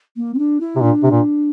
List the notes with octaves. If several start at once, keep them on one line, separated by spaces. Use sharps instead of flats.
A#3
C4
D4
E4
C3
A#2 D4
C3
A#2